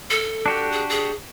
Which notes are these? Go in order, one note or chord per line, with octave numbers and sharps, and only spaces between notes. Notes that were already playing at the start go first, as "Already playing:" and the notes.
A4
D4 F#4 G4
G#4
G#4